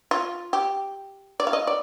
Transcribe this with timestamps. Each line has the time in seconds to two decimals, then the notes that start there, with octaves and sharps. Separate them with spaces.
0.11 F4
0.53 G4
1.40 D5
1.47 F5
1.53 D#5
1.67 D5